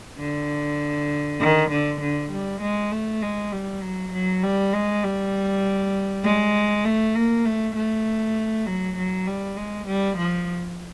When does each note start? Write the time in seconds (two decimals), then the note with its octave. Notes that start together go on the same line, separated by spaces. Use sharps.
0.20 D3
1.40 D#3
1.71 D3
2.01 D3
2.32 G3
2.62 G#3
2.92 A3
3.22 G#3
3.52 G3
3.82 F#3
4.13 F#3
4.43 G3
4.73 G#3
5.03 G3
6.24 G#3
6.85 A3
7.15 A#3
7.45 A3
7.76 A3
8.66 F#3
8.97 F#3
9.27 G3
9.57 G#3
9.87 G3
10.18 F3